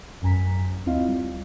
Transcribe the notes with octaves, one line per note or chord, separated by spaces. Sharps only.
A1 F#2 G#5 A#5 B6
D2 C4 E4 F4 D#5 F5
G3